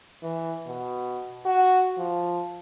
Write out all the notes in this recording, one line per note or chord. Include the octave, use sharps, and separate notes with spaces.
E3
B2
F#4
F3